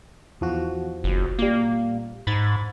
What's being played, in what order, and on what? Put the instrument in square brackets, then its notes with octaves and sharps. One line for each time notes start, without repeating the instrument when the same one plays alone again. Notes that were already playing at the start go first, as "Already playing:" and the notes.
[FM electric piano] E2 F3 F#4
[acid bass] F#1
[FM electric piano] A#2 G3 [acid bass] A#3
[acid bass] G#2 [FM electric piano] B5 G#6 A6